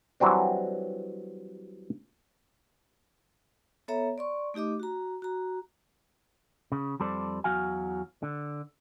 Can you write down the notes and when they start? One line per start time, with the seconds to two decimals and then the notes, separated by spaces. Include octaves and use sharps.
0.20 E3 F#3 G3 C4 D4
3.88 B3 A4 C#5 E5 A#5
4.18 D5 C6 C#6
4.54 A3 D#4 G4 D#5 D6
4.80 F#4 A#5
5.22 F#4 A#5
6.72 C#3
7.00 F2 G3 A4 C5 D5
7.44 E2 F#3 F#4 F5 G#5
8.23 D3